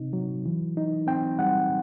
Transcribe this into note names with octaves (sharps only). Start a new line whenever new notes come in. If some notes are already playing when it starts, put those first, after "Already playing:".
Already playing: C3 C4 D#4
F#3
E3
D#4
C4 G5
G3 F#5